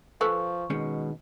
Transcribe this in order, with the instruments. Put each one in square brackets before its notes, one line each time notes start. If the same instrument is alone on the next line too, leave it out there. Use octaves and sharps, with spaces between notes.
[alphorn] F3 [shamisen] A4 B4 G#5 [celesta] C#6
[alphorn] B2 [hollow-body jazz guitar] D#3 G#3 C#4